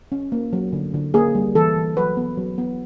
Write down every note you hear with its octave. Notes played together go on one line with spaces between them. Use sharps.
C#4
A#3
F#3
D3
D3
A#3 G#4
G3
E3 A4
E3
F#3 B4
B3
F#3
B3